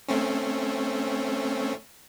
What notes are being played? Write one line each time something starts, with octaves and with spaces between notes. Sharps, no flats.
A3 C4 C#4